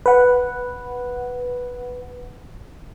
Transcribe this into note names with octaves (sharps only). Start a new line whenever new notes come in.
B4 F#5